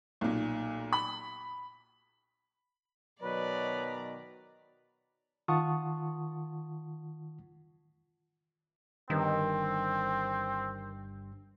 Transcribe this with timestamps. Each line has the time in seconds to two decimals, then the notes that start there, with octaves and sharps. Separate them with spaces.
0.21 B1 A#2
0.93 B5
3.22 B2 D#3 F#3 B4 D5 A#5
5.48 D#3 F4 F#5 A5 C#6 D#6
9.10 G1 G2 D#3 C4